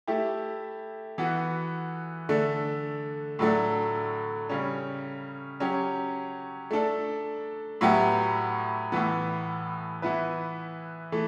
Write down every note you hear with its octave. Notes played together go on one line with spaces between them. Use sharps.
A3 E4 G4
E3 B3 F#4
D3 A3 D4
A2 F#3 A3 D4
C#3 G3 C#4
F#3 C#4 G4
A3 D4 A4
A2 F#3 B3 E4 G4
A2 E3 B3
E3 B3 E4 B4
E3 A3